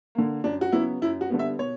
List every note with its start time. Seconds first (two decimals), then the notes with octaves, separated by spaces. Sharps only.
0.15 D3 A#3
0.44 F#2 D4
0.61 F#4
0.72 C#3 F#3 B3 E4
1.02 F#2 E4
1.21 F#4
1.30 D3 G3 B3
1.39 E5
1.59 B2 C#5